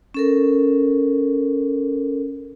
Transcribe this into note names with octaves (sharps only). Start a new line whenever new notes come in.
C#4 A4 A#4